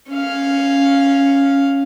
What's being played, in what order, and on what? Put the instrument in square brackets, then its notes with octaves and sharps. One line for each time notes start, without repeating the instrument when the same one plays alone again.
[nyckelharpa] C#4 F5